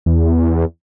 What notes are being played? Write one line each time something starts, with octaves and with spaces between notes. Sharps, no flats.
E2